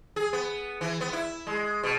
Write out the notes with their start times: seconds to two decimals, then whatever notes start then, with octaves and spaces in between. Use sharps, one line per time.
0.16 G#4
0.33 B3
0.81 E3
1.01 B3
1.13 E4
1.47 G#3
1.83 B2